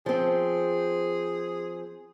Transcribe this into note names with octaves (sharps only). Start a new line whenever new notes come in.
F3 C4 G#4